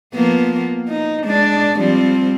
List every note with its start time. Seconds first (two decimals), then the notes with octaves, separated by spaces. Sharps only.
0.14 F3 A#3 B3
0.89 D#4
1.25 G#3 D4 D5
1.79 F3 G3 C4